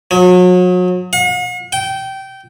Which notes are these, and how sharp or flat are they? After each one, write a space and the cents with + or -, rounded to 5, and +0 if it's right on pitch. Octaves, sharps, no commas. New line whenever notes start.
F#3 -35
F#5 -45
G5 -20